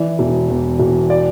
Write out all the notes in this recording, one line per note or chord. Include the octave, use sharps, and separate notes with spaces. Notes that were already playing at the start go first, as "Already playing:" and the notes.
Already playing: E3 D5
E1
E2
E1
D5